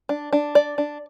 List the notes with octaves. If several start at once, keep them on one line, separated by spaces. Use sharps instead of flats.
D4
D4
D5
D4